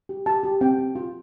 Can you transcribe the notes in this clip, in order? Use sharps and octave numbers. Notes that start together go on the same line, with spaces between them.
G4
G4 A5
G4
C4 G5
C4
F4